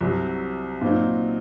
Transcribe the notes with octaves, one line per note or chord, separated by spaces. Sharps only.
C2 C3 F#3
A#2 F#3 C4 D#4